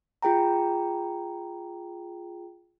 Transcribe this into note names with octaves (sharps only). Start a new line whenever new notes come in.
F4 G#4 G5 A#5